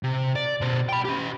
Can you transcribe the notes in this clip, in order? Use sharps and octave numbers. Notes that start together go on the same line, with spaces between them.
C3
D5
B2 C5
G5 B5
C#4 G4